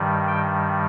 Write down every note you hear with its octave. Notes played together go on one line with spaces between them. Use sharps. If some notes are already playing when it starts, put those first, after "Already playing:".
Already playing: G2 D#3 G3
G5